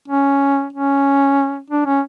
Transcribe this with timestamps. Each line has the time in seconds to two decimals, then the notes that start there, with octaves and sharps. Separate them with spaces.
0.08 C#4
0.73 C#4
1.70 D4
1.86 C#4